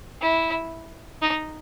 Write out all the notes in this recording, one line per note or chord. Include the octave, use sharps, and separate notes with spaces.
E4
D#4